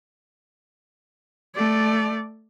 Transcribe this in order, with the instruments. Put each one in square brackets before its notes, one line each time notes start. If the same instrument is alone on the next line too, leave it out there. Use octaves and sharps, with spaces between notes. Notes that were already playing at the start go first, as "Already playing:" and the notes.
[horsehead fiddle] A3 D5